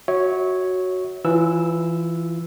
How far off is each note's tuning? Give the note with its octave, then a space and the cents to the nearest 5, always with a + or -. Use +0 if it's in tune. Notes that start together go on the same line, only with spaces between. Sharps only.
F#4 +0 C#5 +0 E5 -40
E3 +15 F4 -5 E6 +0